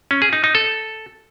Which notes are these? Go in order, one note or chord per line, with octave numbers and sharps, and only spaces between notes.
C#4
G#4
D#4
D#4
A4